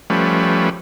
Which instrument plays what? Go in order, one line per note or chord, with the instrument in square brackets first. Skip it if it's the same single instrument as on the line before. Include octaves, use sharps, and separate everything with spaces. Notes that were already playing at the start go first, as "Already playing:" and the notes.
[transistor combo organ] F3 G3 A3 C#4 B4